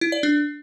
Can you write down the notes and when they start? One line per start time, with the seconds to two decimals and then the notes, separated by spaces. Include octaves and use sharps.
0.01 E4
0.12 D5
0.23 D4